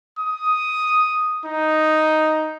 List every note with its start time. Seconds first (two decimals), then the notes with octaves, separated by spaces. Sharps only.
0.19 D#6
1.45 D#4